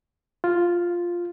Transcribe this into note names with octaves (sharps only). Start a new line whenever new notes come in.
F4